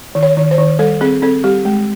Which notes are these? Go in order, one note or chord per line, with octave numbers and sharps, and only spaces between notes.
D#3
C#5
D#3
C5
D#3
G3 A4
C4 G#4
C4 A4
G3 G4
G#3